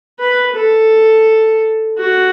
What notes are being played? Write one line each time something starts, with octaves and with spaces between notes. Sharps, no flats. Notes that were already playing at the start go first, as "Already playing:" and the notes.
B4
A4
F#4